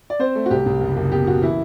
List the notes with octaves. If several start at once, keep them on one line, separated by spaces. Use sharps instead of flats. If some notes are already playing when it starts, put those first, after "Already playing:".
D5
C4 C5
A3
F#4
C2 G4
C2
F#1
F#1
B2 G4
B2 F#4
E3 E4